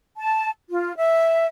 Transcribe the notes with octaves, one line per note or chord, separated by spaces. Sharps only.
A5
F4
E5